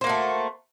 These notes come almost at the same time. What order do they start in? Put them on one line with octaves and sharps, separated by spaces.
C5 A#3 F#4 A3